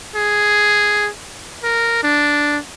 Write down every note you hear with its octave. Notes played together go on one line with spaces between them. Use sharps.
G#4
A#4
D4